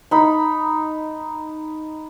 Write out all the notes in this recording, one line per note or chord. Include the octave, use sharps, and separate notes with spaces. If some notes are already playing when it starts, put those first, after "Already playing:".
D#4 B5